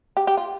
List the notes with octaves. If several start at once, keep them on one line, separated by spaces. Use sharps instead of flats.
G4
G4
F4